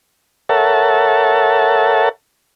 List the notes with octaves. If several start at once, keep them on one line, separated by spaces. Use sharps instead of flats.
A4 A#4 C#5 E5 F#5 A5